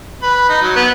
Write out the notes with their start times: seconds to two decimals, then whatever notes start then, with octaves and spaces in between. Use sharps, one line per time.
0.23 B4
0.49 D#4
0.62 F#3
0.76 B3